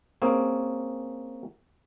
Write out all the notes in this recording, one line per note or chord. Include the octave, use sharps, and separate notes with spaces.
A#3 C4 C#4 G#4